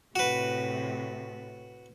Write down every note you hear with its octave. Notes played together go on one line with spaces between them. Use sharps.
A2 C3 F#4 B4